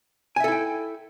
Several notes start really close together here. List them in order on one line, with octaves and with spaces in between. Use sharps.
G#5 E5 A4 E4 G5